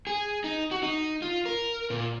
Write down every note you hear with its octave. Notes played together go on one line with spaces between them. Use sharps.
G#4
D#4
F#4
D#4
F4
A#4
A#2